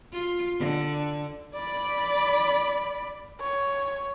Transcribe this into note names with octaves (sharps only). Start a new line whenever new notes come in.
F4
D3
D5 B5
C#5